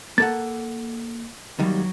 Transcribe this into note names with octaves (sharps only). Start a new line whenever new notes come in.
A#3 A4 F#5 A6
D#2 D#3 F#3 G3